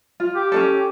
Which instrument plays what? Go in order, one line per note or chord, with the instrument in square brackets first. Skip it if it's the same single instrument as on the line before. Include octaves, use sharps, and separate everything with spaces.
[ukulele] F4
[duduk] G4
[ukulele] C#4 D4 A4